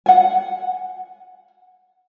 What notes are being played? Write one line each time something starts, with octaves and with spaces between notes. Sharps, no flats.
F#5 G#5